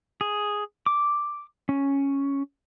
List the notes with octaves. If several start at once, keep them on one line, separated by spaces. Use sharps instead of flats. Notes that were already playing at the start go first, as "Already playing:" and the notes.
G#4
D6
C#4